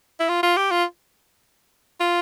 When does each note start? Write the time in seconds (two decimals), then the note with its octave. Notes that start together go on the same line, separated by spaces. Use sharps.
0.20 E4
0.29 F4
0.43 F4
0.57 G4
0.71 F4
2.00 F4